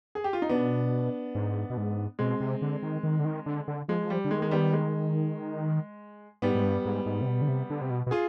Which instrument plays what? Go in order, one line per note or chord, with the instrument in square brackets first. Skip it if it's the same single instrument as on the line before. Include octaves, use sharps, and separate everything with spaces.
[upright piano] G#4
G4
F4
D#4
[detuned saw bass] B2 [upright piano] B3 D4
[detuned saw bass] G#2
B2
G#2
[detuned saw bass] B2 [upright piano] G#3 C4
[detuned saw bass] C3
D3
D#3
D#3
D3
D#3
D3
D3
[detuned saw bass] F3 [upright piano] G#3
[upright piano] G3
[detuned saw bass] D3
[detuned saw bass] D#3 [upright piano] G#3
[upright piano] G#3
G3 B3
G#3
[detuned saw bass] G#2 [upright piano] G3 B3
[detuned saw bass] G#2
G2
G#2
G#2
C3
B2
D3
C3
D3
C3
B2
B2
[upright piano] F4 G#4